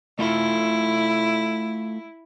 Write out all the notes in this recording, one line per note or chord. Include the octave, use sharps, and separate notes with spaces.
A3 E4 F4 A4